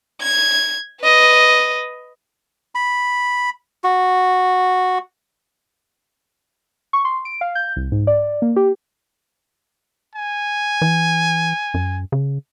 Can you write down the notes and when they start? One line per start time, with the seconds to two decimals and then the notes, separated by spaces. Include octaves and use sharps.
0.21 G#6
1.02 B4 D#5
2.75 B5
3.84 F#4
6.93 C#6
7.05 C6
7.25 D7
7.41 F5
7.55 G6
7.76 C2
7.92 G#2
8.07 D5
8.42 A#3
8.56 G4
10.15 G#5
10.82 E3
11.74 F#2
12.12 C#3